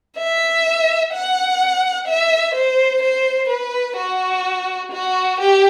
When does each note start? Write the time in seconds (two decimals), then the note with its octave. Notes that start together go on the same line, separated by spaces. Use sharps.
0.17 E5
1.13 F#5
2.07 E5
2.55 C5
3.03 C5
3.49 B4
3.97 F#4
4.92 F#4
5.40 G4